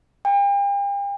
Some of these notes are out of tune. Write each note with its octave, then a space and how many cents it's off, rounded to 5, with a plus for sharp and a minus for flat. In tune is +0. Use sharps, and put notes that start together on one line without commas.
G5 +40